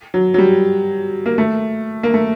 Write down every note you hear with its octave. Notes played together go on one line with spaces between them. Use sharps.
F#3
F#3
G3
A#3
A3
A#3
A3